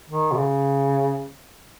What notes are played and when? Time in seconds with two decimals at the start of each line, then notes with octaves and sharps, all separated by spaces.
0.10 D#3
0.32 B2
0.37 C#3